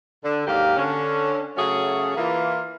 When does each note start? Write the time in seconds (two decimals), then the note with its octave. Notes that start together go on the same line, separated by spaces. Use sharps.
0.24 D3
0.46 D#2 G#2 F#3 A#3 G4 F5
0.77 D3 C#4
1.57 C#3 F#3 A3 C#4 F#4 G#4
2.17 E3 A#3 F4